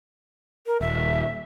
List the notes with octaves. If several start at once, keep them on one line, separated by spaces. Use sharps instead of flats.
A#4
D#1 E5